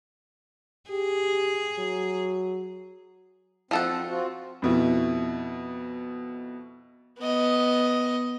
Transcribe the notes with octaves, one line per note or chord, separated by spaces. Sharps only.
G4 G#4
F#3
F3 C4 A4 F#5
C4 F4 F#4
F2 B2 E4
B3 D#5